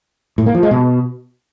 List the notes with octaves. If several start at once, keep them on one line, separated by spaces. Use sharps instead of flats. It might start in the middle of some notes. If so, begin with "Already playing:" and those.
A2
A#3
F3
G#3
B2